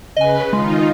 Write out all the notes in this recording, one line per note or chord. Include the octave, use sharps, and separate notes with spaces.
C#3 B4 D#5 G#5
D#3 G#3 D#4 F4